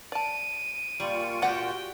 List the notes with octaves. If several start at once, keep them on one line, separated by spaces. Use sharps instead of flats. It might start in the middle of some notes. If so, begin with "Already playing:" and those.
D5 A5 D7 D#7
A#2 G3 F4 C#6
F#4 G4 D5 F#5 G5